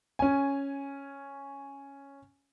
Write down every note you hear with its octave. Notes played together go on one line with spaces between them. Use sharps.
C#4 G#5